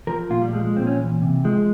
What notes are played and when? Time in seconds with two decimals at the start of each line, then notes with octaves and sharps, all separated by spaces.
0.07 F3 A#4
0.30 A#2 F4
0.42 G3
0.53 F3 G#3
0.65 G#3
0.76 A#2 C4
0.87 C#4
0.99 E3
1.21 C3
1.44 F3 G#3